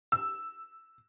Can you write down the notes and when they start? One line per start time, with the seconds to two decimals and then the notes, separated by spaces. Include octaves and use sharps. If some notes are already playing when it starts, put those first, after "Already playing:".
0.12 E6